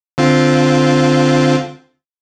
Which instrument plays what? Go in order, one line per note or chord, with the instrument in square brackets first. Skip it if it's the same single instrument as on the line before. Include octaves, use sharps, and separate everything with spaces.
[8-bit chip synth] D3 C4 F4